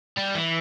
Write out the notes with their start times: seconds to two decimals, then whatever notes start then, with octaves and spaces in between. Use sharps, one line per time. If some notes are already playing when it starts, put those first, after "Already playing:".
0.18 G3
0.36 E3